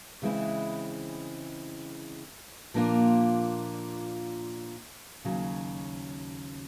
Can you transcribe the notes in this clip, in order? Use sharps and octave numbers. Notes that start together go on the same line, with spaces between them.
C#3 E3 G#3 C4 E4
A#2 F3 A#3 D4 F4
D#2 C#3 F#3